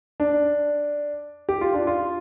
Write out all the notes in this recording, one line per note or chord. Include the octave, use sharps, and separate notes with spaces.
D4
G4
F4
D4
F4